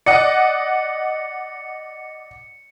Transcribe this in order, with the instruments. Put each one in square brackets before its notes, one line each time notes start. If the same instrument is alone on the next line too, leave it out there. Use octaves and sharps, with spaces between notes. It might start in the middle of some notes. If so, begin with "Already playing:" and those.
[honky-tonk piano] D5 D#5 F#5 [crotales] C#7